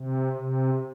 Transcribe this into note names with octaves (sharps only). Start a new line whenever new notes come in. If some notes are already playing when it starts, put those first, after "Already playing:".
Already playing: C3
C3